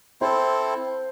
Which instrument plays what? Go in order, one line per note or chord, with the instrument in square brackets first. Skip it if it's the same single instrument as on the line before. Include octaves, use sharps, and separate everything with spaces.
[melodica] C4 E4 A4 [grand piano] C5